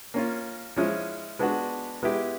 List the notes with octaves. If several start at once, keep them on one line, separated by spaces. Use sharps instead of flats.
A#3 C#4 F4
F3 G#3 C#4 E4
G#3 B3 D4 F#4
G#3 B3 E4 G4